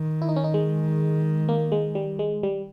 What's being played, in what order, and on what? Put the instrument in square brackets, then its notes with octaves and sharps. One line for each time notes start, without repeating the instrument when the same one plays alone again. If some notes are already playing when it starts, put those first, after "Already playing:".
Already playing: [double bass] D#3
[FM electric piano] E4
D#4
C#4
D#4
G#3
A#3
G#3
G3
G#3
G3